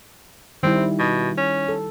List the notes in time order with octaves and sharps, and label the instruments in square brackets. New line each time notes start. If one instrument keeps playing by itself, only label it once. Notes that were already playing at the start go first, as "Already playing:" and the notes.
[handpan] D#3 G3 E4 [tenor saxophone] C4
[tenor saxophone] B2
C#4
[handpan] A4